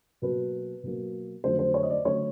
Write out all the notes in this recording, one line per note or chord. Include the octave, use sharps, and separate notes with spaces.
B2 F#3 A#3 B4
B2 F#3 A#3
F2 D3 F#3 A3 C5
C5
C#5
D#5
D5
D3 F#3 A3 C#5